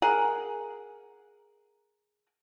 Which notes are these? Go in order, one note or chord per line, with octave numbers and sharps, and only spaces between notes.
G#4 A#4 F#5